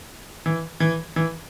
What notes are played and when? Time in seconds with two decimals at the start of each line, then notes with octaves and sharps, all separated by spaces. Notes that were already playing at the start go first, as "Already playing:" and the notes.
0.46 E3
0.80 E3
1.16 E3